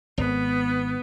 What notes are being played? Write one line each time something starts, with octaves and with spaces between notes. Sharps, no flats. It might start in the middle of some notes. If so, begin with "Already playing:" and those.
G#1 B3